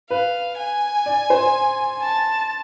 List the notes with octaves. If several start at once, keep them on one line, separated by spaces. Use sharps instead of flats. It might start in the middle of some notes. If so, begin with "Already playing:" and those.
B4 F5
G#5
D5
C5
A5